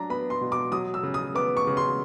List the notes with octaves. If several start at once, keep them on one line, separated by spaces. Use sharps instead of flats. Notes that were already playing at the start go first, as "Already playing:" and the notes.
Already playing: F#3 D4 A#5
B3 B5
C6
B2
D6
F#3 D#6
E6
C#3
D#6
B3 D6
C#6
C#3
C6